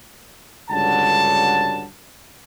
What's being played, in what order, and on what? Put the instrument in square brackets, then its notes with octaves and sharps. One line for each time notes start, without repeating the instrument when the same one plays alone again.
[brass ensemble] C#2 G2 D3 F#3 F#5 A5